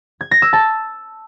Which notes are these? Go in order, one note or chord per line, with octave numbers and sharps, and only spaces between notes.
G#6
A#6
E6
A5